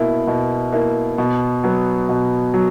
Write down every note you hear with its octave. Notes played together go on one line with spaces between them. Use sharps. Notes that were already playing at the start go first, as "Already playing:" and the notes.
Already playing: B2 A#3 E4
B2
A#3 E4
B2
F#3 B3
B2
F#3